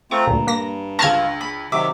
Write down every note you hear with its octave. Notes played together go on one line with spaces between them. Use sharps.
A3 C4 F4 A#5 C#6
D2 G2 A#2
A#3 A#6
C#2 D4 F4 A5 C#6 F6 G#6 A#6
B5
C3 D#3 F#3 E5 D6